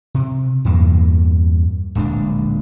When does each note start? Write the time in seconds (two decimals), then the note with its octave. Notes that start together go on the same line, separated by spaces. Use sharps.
0.15 C3
0.65 E2 G2 A#3
1.95 D1 A#1 G#3 D4